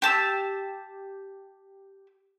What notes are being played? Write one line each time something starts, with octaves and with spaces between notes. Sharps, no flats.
G4 A5 E6